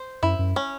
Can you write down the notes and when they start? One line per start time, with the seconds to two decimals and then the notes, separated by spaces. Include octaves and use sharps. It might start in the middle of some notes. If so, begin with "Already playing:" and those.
Already playing: C5
0.22 F#2 E4
0.39 F#2
0.56 C#4